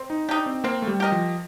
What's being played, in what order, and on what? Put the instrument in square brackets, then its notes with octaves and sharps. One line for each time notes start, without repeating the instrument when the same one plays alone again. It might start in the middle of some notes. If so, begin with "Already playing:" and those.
Already playing: [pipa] C4
[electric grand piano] D#4
[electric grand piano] D4 [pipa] D#4 G4
[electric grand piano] C4
[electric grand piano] A#3 [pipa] C4
[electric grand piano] A3
G3
[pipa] G4 A#4 D#5
[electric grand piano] F3